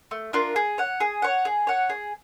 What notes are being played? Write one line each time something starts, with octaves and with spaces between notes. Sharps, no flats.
A3
D4 F4 A#4
G#4
C#5 F#5
G#4
C#5 F#5
G#4
C#5 F#5
G#4